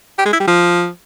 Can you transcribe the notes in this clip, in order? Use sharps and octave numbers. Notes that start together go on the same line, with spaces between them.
G4
G#3
E4
G3
F3